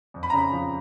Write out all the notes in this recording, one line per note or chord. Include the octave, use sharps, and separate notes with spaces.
F2
B5
C#3 A#5
B5
F3